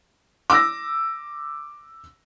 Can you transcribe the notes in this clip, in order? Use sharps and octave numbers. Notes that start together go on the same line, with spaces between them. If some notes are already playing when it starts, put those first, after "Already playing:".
D6 E6 A#6